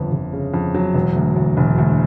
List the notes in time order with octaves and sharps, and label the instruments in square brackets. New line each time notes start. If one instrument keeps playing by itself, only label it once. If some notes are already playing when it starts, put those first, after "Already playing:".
Already playing: [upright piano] G1 F2
G1
C#3
F2
F#3
E1
D2
D2
E1
D2